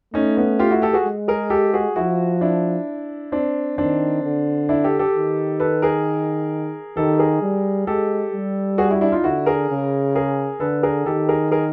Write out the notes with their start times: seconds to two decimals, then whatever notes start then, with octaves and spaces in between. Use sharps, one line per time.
0.14 A3 C#4 D#4
0.37 B3 C#4
0.59 F4 G4
0.71 E4 F#4
0.82 G4 A4
0.93 F#4 G#4
1.06 G#3
1.28 G#4 A#4
1.50 G4 A4
1.74 F#4 G#4
1.96 F3 E4 F#4
2.41 D4 E4
3.32 C4 D4
3.78 D#3 C4 D4
4.24 D3
4.69 D4 E4
4.84 G4 A4
4.99 G4 A4
5.15 D#3
5.60 A4 B4
5.82 G#4 A#4
6.97 D#3 G4 A4
7.19 G#4 A#4
7.42 G3
7.87 G#3 G4 A4
8.33 G3
8.78 F#4 G#4
8.90 E4 F#4
9.01 D4 E4
9.12 D#4 F4
9.24 D3 E4 F#4
9.46 G#4 A#4
9.70 C#3
10.15 G#4 A#4
10.60 D3 A4 B4
10.83 G#4 A#4
11.06 D#3 G4 A4
11.29 G#4 A#4
11.51 G#4 A#4